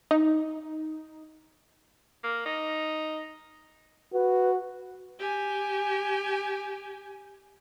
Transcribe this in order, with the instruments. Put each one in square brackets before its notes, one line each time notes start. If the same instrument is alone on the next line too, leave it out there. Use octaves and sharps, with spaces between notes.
[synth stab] D#4
[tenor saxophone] A#3
D#4
[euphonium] F#4 [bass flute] B4
[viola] G4 G#5